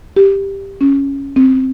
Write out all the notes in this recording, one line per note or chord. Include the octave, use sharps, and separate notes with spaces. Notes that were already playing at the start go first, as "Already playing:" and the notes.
G4
C#4
C4